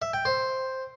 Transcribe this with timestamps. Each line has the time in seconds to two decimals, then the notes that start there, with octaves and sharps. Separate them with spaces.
0.02 E5
0.14 G5
0.25 C5